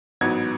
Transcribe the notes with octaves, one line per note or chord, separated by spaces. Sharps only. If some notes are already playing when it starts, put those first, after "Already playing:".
A1 G#2 F#3 B3 G#6